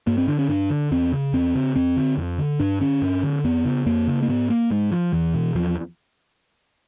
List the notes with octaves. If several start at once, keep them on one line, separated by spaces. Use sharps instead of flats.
G2 A#3
C4
D3 D4
C#4
G2 D4
D3
E2 C4
C#3
E2 C4
C#3
F2 C4
D3
F2
D3
G2 D4
D3 C#4
G2
D3
F2 B3
C#3
F2 A#3
C#3
A#3
G#2 B3
A#3
G#2 G#3
F3
E2 E3
B2
E2 F3